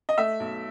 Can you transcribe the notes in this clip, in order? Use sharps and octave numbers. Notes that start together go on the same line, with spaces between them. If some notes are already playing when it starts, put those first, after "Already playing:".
D#5
A3 E5
B1